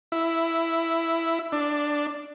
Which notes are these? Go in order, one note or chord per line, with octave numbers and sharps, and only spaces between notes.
E4
D4